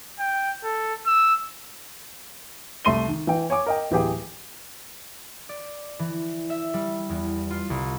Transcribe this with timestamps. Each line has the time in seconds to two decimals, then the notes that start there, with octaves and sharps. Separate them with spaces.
0.20 G5
0.64 A4
1.07 E6
2.85 C2 A3 C6 D#7 G7
3.08 D#3
3.27 E3 G5
3.50 C#5 G#5 D6
3.66 A#4 D#5 G5
3.91 D1 E3 B3 G4 G#4 G5
5.49 D5
5.99 E3
6.50 E5
6.74 G3
7.10 E2
7.51 F4
7.70 C2